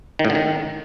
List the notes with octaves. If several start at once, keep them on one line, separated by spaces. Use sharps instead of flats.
D#3
A2
D3
D#3